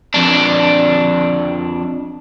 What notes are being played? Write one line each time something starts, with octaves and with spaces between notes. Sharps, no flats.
F2 D4